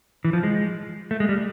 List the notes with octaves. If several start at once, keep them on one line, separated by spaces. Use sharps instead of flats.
E3
F3
G#3
A3
G#3
G3